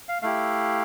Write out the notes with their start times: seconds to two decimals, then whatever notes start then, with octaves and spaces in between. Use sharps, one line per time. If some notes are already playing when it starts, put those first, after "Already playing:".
0.09 F5
0.22 A3 E4 G4 F5